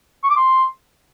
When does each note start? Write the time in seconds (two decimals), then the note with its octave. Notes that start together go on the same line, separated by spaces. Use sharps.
0.24 C#6
0.30 D6
0.36 C6